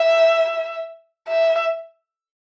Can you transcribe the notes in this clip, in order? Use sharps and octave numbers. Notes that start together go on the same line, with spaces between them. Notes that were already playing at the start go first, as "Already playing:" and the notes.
Already playing: E5
E5